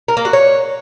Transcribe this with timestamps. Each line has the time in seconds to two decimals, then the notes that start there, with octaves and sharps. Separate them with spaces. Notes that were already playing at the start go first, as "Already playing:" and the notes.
0.08 A#4
0.17 A#3
0.25 F#4
0.33 C#5